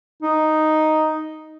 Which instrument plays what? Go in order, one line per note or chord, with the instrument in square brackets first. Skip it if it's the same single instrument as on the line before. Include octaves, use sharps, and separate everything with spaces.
[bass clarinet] D#4